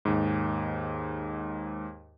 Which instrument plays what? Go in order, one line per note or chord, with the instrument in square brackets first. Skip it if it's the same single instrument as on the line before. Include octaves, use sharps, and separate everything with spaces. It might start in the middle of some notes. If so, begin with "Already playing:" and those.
[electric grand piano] D#2 G#2